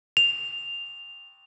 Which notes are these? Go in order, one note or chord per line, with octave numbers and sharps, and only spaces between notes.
F7